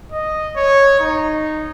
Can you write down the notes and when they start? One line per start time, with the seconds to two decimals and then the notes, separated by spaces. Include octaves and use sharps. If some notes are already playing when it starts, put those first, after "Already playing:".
0.12 D#5
0.56 C#5
1.00 D#4